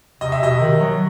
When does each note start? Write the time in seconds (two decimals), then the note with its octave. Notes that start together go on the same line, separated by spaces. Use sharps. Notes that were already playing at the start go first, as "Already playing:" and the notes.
0.21 C3 D#5
0.32 E5
0.41 B2 D#5
0.56 C3
0.60 D#3
0.81 F#3